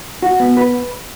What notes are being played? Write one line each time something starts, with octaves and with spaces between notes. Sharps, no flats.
F#4
B3
B4